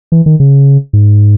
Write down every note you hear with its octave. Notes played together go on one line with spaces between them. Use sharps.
E3
D#3
C#3
G#2